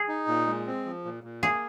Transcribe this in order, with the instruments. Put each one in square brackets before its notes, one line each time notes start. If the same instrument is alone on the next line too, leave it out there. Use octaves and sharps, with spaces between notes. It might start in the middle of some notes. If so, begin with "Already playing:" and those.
Already playing: [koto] G#4
[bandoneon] D#4
A#2
G#3
C4
F3
A#2
A#2
[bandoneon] A#3 [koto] G#4